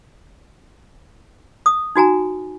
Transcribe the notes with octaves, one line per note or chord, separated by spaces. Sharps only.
D#6
D#4 F#4 G#5 A#5